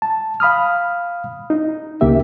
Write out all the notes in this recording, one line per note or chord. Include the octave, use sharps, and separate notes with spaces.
A5
F5 B5 D#6 F6
D#4
C#2 C#3 A#3 G4 E5